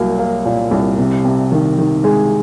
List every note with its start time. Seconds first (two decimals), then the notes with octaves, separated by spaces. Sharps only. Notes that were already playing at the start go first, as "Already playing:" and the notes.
Already playing: C2 F#3 A#3
0.19 A#3
0.45 A#2
0.71 C2
0.98 C3
1.25 C3
1.52 D#3
1.78 D#3
2.04 G#3